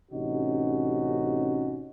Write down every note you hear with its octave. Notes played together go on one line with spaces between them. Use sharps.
A1 C3 C#4 D#4 F#4